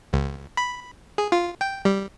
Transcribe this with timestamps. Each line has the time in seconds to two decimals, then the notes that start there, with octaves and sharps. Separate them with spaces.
0.13 C#2
0.57 B5
1.18 G#4
1.32 F4
1.61 G5
1.85 G3